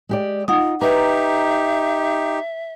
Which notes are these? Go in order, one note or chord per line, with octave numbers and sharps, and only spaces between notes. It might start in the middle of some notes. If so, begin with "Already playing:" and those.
G#3 G4 D5
D#4 F4 F#5 D#6
D#4 G4 B4 E5 A#5